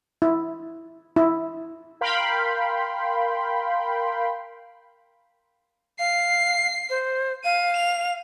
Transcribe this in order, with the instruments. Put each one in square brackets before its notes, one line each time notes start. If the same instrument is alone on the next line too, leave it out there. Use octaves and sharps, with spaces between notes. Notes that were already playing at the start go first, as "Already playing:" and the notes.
[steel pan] E4
E4
[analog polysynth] A#4 F5 G5 B5 C6
[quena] F5 [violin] C7
[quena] C5
[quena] F5 [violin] D#7
[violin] F7